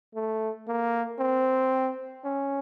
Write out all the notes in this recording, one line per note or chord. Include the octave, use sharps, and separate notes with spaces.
A3
A#3
C4
C#4